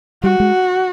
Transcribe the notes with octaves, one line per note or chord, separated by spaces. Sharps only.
G3 F#4
G#3